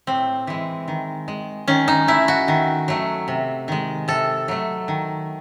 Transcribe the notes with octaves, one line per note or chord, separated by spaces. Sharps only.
A2 C4
E3 G#3
D#3
G#3
D#3 C#4
D#4
A3 E4
F#4
D#3
F#3 A3
C3
D#3 G#3
C3 A4
F#3 A3
D#3